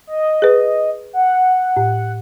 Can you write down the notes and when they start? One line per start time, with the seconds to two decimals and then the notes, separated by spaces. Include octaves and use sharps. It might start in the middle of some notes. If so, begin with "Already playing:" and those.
0.07 D#5
0.42 G#4 B4
1.13 F#5
1.77 A2